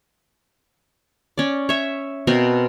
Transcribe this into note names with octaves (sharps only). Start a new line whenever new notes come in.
C#4 D5
C#5 E5
B2 C4 A#4